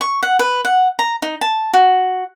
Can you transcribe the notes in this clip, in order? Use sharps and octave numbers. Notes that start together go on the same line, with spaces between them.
C#6
F#5
B4
F#5
A#5
D#4
A5
F#4